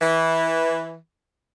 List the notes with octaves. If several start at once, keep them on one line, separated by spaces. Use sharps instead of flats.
E3